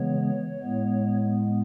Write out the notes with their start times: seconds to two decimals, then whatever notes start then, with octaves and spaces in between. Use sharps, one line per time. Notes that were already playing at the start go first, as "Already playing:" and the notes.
Already playing: C#3 E3 G#3 B3 C#5
0.61 A2 G#3 B3